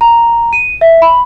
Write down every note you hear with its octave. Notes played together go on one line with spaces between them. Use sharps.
A#5
D#7
E5
B5